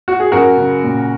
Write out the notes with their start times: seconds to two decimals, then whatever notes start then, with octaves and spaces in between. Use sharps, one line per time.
0.08 F#4
0.20 G#4
0.32 F#2 F#4 A#4
0.57 C#3
0.83 A#2